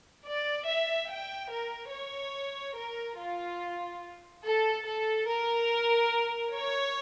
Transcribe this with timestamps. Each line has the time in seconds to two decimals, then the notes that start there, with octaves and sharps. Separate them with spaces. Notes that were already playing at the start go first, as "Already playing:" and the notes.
0.25 D5
0.66 E5
1.09 G5
1.51 A#4
1.92 C#5
2.76 A#4
3.18 F4
4.44 A4
4.86 A4
5.27 A#4
6.53 C#5